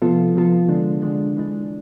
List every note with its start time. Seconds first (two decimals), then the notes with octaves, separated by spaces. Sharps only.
0.02 C3 F3 B3 F4 A4
0.35 C3 F3 B3 F4 A4
0.69 D3 G#3 D4
1.02 D3 G#3 D4
1.37 E3 G#3 D4